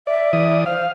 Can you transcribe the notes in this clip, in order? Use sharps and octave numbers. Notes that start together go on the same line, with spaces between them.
D5 E5
E3 D5 D#6
C5 F5